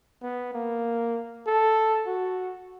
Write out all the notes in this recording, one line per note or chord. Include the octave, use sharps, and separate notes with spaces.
B3
A#3
A4
F#4